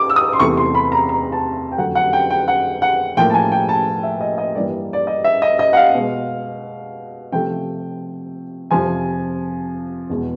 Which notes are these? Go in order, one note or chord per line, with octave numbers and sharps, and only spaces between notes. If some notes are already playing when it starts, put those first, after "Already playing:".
Already playing: D6
E6
D#6
C6
E2 C3 E3 A3 C#6
C6
B5
A#5
A#5
A5
G5
F2 D3 F#3 A3 F#5
F#5
G5
G5
F#5
F#5
A2 F3 A#3 G5
A5
G#5
G5
A5
E5
D#5
D#5
G2 E3 G3 A#3 D5
D5
D#5
E5
D#5
D#5
F#5
F5
B2 G#3
C3 F3 A3 G5
F2 C3 F3 G#5
E2 B2 G#3